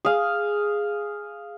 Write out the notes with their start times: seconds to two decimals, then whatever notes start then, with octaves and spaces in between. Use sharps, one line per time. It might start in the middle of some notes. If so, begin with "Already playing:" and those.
0.05 G#4 F5